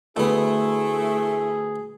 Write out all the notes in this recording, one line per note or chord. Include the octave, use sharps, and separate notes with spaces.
D2 A3 B3 E4 G#4